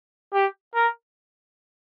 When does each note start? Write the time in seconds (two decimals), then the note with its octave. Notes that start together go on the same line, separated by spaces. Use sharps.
0.34 G4
0.75 A#4